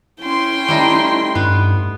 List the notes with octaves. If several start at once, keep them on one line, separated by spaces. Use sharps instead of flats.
C#4 E4 G5 C6
G3 A3 D#4
G2 B3